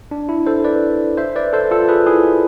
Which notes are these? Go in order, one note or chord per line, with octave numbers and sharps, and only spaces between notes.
D4
E4
A4 C5
B4 D5
C5 E5
B4 D5
A4 C5
F4 A4
G#4 B4
E4 G#4